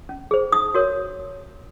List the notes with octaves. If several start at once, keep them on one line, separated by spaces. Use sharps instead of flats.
C#4
G#4 C5
D#4 D#6
F#4 A#4 C#5